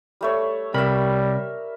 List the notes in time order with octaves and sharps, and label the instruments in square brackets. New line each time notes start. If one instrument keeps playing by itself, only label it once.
[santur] G3 A3 C#5
[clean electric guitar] C3 B5 [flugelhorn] G3 [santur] A#4 E5